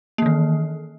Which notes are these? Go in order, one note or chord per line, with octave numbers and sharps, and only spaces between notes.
D#3 E3 A#3